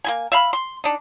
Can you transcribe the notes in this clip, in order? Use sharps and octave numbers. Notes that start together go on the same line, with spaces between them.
A#3 E4 G#5
E5 F5 B5
C6
D4 D#4